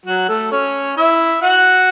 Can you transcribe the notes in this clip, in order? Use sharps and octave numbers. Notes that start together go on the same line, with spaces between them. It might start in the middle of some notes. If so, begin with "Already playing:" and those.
F#3 F#4
A3 A4
C#4 C#5
E4 E5
F#4 F#5